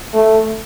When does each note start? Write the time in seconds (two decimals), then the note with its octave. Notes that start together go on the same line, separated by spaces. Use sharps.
0.14 A3